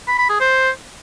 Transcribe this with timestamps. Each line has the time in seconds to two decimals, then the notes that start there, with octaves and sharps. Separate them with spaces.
0.08 B5
0.19 B5
0.29 G#4
0.40 C5